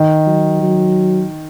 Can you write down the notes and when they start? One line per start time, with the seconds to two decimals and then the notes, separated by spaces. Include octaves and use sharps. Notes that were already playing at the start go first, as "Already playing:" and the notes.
Already playing: D#3
0.26 F#3
0.62 F#3